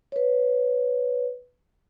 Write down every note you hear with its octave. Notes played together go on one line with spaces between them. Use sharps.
B4 C#5